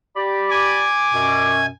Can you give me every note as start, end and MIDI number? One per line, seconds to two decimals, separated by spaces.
0.16 0.87 67
0.16 0.87 74
0.16 0.87 83
0.50 1.66 80
0.50 1.61 86
1.14 1.68 42
1.14 1.68 47